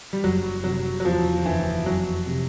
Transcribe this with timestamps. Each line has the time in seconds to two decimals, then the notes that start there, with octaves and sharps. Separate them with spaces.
0.13 G3
0.24 F#1 F#3
0.64 C3 F#3
1.00 F#3
1.05 E2 F3
1.46 F#1 E3
1.86 F2 F#3
2.27 C3